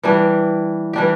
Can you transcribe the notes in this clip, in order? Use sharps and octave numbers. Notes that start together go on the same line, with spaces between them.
E3 G3 D4 G4
E3 G3 D4 G4